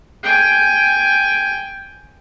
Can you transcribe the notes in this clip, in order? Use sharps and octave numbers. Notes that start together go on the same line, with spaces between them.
G5 G#5